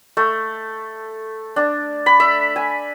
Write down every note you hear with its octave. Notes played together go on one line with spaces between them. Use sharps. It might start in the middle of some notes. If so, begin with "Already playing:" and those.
A3
D4
B5
E5
G#5